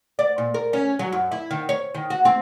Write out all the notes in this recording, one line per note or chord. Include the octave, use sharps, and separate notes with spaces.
D5
A#2
A#4
C#4
F#3
F#2
E4
D#3
C#5
D#3
F#4
C4